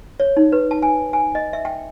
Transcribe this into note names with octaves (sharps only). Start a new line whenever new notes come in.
C#5
D#4
B4
A5
G#5
G#5
D#5
E5
G5